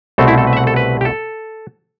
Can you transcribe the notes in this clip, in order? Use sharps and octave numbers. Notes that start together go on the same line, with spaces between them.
C2 B2 A3 C4 A4
E4
A4
B4
E5
F#5
A4
B4
G4
A4